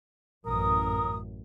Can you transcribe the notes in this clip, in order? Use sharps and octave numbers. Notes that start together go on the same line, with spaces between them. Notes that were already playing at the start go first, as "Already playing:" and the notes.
A1 F#2 A#4 D#6